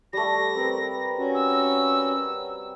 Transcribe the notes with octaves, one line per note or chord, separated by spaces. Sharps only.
G3 A3 A#6
C4 A#4 B4
C#4 F#4
E6